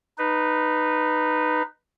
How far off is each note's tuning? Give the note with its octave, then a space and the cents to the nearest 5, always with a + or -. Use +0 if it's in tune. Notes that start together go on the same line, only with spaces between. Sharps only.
D#4 -15 B4 +0